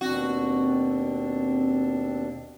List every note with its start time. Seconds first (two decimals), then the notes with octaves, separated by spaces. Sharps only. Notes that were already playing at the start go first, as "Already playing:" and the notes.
0.01 D#2 B2 C4 D4 F#4